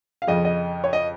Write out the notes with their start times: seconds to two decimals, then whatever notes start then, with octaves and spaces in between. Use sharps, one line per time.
0.22 F5
0.27 F2 C#3 F3 D#5
0.45 D#5
0.84 C#5
0.93 D#5